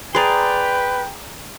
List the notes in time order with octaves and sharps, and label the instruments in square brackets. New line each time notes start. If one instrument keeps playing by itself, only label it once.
[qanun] G#4 D5 [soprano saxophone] B4 [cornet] G5 [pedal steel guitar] A#5 C6